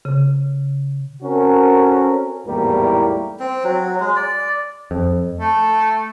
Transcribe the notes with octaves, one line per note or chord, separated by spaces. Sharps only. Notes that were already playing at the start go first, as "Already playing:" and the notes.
C#3
C4 C#4 F#4 A4 A#4
G#1 E2 A2 G3 A#3 A#4
C4
F#3
G#3
D5
F2
A3